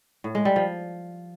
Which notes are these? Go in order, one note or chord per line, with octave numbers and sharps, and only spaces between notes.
A2
G#3
G3
F3